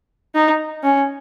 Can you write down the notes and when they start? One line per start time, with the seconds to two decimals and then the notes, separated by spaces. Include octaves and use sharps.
0.35 D#4
0.83 C#4